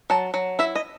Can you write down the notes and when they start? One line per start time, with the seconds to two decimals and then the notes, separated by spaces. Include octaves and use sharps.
0.10 F#3 A5
0.34 F#3
0.59 E4 E5
0.75 D#5